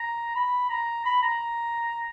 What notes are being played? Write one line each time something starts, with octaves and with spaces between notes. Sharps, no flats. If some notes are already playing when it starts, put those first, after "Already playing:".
Already playing: A#5
B5
A#5
B5
A#5